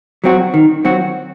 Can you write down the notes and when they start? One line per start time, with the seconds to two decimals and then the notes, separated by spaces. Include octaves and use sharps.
0.24 F#3 C4 F#4
0.54 D#3
0.85 F#3 C4 F#4